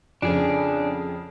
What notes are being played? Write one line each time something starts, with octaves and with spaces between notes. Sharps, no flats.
F2 C#3 D4 G#4